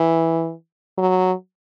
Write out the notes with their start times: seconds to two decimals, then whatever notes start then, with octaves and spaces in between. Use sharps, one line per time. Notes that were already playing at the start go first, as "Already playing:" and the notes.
Already playing: E3
0.98 F#3